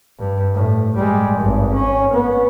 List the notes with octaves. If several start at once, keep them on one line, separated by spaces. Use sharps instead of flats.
G2
A2
G3 G#3
G#1 G2
C#4
B3